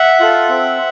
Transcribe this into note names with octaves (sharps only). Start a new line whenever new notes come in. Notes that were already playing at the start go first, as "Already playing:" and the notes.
Already playing: E5 F#5
F4 A4
C4